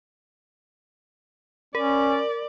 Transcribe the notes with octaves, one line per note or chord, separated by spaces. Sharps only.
C#4 A#4 D5